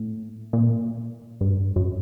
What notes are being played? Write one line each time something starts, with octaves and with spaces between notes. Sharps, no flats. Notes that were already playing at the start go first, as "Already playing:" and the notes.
Already playing: A2
A#2
G2
F#2